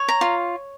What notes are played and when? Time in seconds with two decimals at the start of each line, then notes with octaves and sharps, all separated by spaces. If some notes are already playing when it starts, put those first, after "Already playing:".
Already playing: C#5
0.08 A#5
0.21 F4